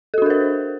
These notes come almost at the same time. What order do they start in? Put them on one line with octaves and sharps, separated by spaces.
A4 F#4 D4 A#4 C5